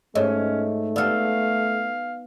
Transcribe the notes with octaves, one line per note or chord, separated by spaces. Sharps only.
G#2 A3 C#4 C#5 D#5
B3 A4 D5 F5 E6 F6